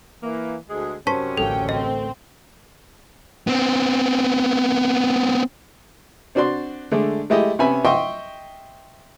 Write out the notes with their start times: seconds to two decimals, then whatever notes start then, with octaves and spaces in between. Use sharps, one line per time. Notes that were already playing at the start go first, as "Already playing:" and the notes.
0.23 E3 A#3
0.69 D2 G#3 G#4
1.07 F#2 C3 C#4 C5 A5 C#6 B6
1.37 A1 D2 A3 A#3 A4 G5
1.69 C4 D#5
3.47 B3 C4
6.35 C4 D4 F#4 D5 C6
6.91 D3 G#3 A3 D4
7.30 G#3 A3 E4 G4 D#5
7.59 C3 B3 C#4 E5 G#5 B5
7.85 D#5 E5 G5 C6 C#6